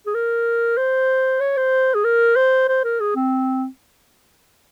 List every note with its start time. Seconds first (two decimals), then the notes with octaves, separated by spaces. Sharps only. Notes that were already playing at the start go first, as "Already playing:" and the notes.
0.06 G#4
0.14 A#4
0.77 C5
1.40 C#5
1.57 C5
1.94 G#4
2.04 A#4
2.36 C5
2.68 C5
2.84 A#4
3.00 G#4
3.15 C4